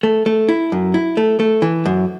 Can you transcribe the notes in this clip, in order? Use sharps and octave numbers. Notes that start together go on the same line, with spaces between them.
A3
A3
E4
F#2
E4
A3
A3
E3
F#2